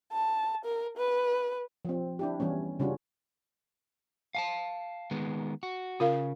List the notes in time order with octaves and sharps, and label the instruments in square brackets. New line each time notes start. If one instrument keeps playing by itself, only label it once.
[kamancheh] A5
A#4
B4
[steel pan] F3 C4
D4 E4 G4
E3 G3 B3 C#4
C#3 G3 C#4 D4 F4 F#4
[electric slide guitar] F5 G#5 A5
D#3 G#3 B3
F#4
[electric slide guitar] C#3 [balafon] F4 A#4 F5